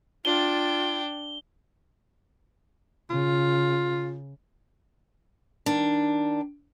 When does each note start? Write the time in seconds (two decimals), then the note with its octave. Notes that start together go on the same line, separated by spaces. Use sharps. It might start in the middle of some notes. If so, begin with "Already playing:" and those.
0.25 D4 F4 G5 G7
3.10 C#3 F4
5.66 D#3 D4